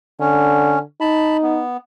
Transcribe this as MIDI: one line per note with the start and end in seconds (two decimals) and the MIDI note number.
0.20 0.82 50
0.20 0.79 61
1.01 1.61 63
1.01 1.37 81
1.01 1.37 83
1.42 1.77 59